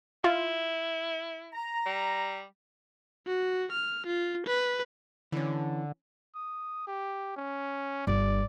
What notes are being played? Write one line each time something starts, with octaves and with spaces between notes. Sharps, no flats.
E4 F4
A#5
G3
F#4
F6
F4
B4
D3 E3 C#4
D#6
G4
C#4
G1 D5